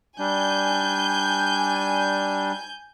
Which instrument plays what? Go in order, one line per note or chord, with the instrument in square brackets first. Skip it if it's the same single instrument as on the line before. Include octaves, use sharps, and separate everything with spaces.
[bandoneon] G3 D4 [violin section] G#5 G6